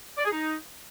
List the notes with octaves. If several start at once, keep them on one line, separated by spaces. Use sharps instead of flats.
D5
G#4
D#4